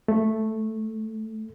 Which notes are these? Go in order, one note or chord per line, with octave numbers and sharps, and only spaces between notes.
A3